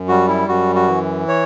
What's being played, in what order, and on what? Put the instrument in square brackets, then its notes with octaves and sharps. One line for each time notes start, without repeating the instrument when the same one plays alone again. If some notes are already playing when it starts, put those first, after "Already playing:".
Already playing: [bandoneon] F#2
G3 F#4
E4
F#2 F#4
F#4
E3
C#5